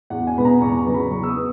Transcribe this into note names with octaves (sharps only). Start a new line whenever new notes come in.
E2 F#5
G#5
B2 G#3 B3 B5
A#5
E2 C#6
A#5
C#3 F#3 B3
B5
E2 C#6
E6
D#6
B3